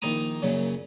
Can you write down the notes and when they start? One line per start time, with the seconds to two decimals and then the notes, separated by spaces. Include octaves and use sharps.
0.02 A#1 D#3 D#4 E4 A#5 D#6
0.42 F#2 A#2 C#3 F#3